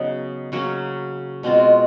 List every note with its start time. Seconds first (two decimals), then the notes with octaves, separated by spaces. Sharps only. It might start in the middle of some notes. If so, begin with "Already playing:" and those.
Already playing: C#3 F#3 B3 D#4
0.52 C#3 F#3 A#3 C#4
1.43 B2 G#3 C4 F4